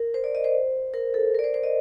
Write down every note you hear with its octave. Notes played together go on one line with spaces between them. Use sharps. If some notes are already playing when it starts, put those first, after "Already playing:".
Already playing: A#4
C5
D5
D#5
C5
A#4
A4
A#4
D5
C5
C5
D#5